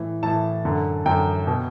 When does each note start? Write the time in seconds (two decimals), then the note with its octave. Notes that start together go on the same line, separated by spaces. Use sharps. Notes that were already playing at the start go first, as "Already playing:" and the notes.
Already playing: A2 E3
0.23 A2 E3 A5
0.65 F#2 D3
1.06 F#2 D3 G5
1.47 B2